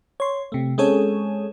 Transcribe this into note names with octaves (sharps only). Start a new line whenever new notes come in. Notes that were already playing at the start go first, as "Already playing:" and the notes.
C#5 C6
C3 A3
G#3 C4 C#4 G#4 A4 C#5